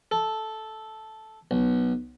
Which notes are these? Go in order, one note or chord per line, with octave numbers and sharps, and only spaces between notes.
A4
B1